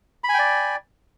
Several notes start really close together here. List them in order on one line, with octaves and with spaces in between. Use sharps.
B5 G#5 G5 D5